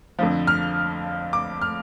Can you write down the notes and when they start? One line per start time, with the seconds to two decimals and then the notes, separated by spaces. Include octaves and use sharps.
0.19 F2 D3 F3
0.47 F6
1.33 D6
1.62 F6